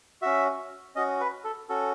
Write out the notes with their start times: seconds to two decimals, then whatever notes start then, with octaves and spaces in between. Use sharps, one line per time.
0.22 C#4 F#4 E5
0.95 C#4 F#4 D#5
1.20 B4
1.44 A4
1.69 C#4 F#4 A4